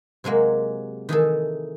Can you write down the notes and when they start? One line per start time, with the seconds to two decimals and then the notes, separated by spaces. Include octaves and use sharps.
0.24 C3 F#3 G#3 A#3
1.09 D#3 E3 G#4 A4